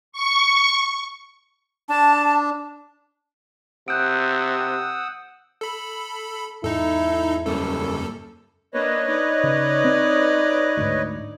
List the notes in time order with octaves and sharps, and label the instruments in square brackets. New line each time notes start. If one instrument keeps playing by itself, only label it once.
[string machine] C#6
[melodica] D4 [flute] A5
[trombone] C3 [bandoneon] F#5 D#6 E6 [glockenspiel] F#6 G6 D7
[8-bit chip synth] A4 B5
[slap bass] E2 G#2 [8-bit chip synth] D#4 A4 [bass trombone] E4
[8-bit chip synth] F#2 A4 [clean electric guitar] C#3 G3 A#3
[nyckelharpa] A#3 D4 [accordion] B4 C#5 D#5
[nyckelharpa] D#4 D5
[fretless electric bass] C#3
C4
D2 G#2